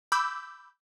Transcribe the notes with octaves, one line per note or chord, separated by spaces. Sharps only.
B5 D6 E6 G6